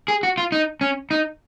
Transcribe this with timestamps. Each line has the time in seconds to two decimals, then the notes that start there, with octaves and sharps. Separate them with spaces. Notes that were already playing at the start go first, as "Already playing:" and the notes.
0.08 G#4
0.23 F#4
0.38 F4
0.52 D#4
0.81 C#4
1.11 D#4